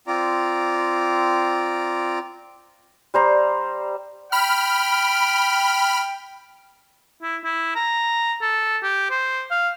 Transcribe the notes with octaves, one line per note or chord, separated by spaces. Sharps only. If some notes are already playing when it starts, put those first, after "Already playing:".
C4 F4 D5 A#5
G3 C5 A#5
G5 B5 F6
E4
E4
A#5
A4
G4
C5
F5